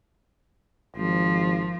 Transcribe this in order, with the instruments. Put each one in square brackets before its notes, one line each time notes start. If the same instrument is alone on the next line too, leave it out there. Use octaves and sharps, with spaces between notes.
[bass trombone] G#1 [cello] F3